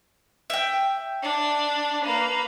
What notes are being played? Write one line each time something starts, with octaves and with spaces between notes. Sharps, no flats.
E5 G5
D4
A#3 B4